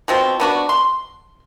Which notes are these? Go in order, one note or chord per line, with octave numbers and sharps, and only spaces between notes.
B2 F3 C4
B3 D4 F#4
C6